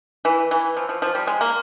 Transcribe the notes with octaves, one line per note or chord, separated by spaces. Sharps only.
E3
E3
F3
F3
F3
G3
G#3
A#3